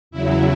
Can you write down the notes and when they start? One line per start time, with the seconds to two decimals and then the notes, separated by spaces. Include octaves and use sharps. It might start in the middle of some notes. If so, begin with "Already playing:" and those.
0.11 E2 C#3 F#3 E4